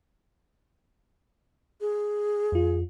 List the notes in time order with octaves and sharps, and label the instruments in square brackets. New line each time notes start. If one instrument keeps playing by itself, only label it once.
[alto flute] G#4
[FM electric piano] F2 F4